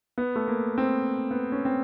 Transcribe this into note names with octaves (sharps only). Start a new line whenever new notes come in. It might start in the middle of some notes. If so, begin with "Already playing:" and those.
B3
A3
A#3
C4
B3
C#4
C4